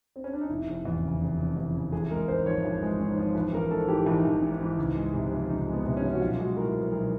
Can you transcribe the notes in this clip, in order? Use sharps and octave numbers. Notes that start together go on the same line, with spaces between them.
C4
C#4
D4
D#4
F1 E4
F1
E2
C#3
F1
F1
E2
C#3
A1 G#4
G#3 A#4
G#2 C5
F3 C#5
A1 B4
G#3
G#2
F3
A1 B4
A1 A#4
G#2 A4
E3 G4
A1 D#4
A1
G#2
E3
C#2
G#3
C3
F3
C#2 D#4
G#3
B3
C3
C#4
F3
F#4
B1 F4
G#3 F#4
A2 A#4
F3
B4
B1 A#4